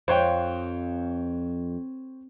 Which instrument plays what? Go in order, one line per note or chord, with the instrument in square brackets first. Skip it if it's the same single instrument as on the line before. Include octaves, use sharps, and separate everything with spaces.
[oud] F2 [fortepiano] C5 C#5 G5